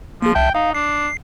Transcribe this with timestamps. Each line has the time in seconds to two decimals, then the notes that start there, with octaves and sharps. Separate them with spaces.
0.22 F3 A#3 G#4
0.35 C2 E5 G5 A5
0.55 D#4 F5
0.74 D4 C7